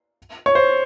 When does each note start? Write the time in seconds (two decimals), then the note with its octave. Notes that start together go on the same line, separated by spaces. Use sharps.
0.46 C#5
0.55 C5